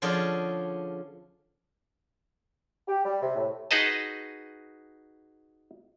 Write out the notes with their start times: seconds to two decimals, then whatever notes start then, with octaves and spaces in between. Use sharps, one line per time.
0.02 D3 F3 C#4 F4 G#4 D5
2.88 G4
3.05 G3
3.22 C3
3.36 A2
3.71 D#4 F#4 G#4 B4 D#5 A5